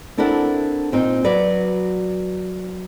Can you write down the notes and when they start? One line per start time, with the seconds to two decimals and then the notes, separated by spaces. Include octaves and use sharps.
0.17 C4 D4 E4 A4 A#4 F#5
0.92 A#2 C4 D#4
1.24 F#3 F#4 B4 D5